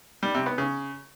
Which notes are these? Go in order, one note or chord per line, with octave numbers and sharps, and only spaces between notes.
G3
C3
B3
C#3